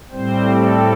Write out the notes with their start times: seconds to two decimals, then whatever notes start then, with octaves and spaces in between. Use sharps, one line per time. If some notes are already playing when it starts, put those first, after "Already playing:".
0.11 A2 G3 C4 C5
0.51 A4